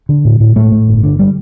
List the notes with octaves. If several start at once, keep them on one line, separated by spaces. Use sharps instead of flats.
D3
A2
A2
A2 A3
A2
G1
D3
G3